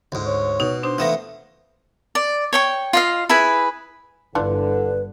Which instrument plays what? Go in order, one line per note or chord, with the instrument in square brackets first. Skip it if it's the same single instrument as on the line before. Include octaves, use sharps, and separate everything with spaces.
[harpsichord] D2 G#2
[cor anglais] C#5
[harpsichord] B2 [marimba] D#4
[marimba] D4 D#6 [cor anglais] C5
[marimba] E3 E5 A#6 [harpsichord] A3 B3 F4
[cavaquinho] D5
C#5 G5 C#6
F4 D#5 F5
E4 G#4 B4 G#5
[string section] G1 [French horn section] D3 [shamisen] E3 D4 F4 [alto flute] B4